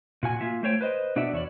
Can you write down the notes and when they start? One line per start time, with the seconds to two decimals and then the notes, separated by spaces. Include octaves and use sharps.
0.23 A#2 F#4 G#5
0.41 A#3 F4 E5
0.63 A3 C5 C#5 G5
0.81 B4 C5 D#5
1.16 B2 D4 F#4 D5 E5
1.32 E2 C#5 D5